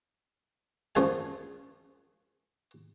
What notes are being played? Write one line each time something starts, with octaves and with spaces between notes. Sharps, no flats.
F#2 F3 G#3 F5 G#5